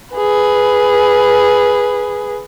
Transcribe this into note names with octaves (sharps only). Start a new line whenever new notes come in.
G#4 B4